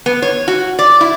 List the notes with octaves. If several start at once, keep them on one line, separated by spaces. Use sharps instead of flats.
B3
C#5
F#4
D5
E4